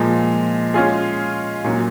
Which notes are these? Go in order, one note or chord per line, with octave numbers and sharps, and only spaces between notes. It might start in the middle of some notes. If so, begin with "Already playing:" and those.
Already playing: A#2 F3 G#3
G#3 C#4 F4 G#4
A#2 F#3 C#4